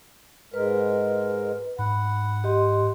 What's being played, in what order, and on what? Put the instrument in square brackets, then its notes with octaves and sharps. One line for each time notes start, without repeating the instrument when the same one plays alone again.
[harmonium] G#2 G#3 A#4 [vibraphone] B4
[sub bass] G#2 [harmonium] F#5 [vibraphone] B5
[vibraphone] G4 D#5 C6